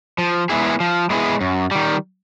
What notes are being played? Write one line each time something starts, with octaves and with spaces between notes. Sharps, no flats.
F3
G#3 B3 E4 G#4
F3
G#3 B3 E4 G#4
F#2
D#3 G3